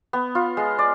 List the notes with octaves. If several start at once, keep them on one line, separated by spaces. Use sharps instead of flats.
B3
F4
G#3
D5